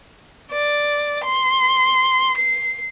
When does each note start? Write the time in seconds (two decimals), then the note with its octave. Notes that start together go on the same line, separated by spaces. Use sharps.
0.52 D5
1.24 C6
2.38 C7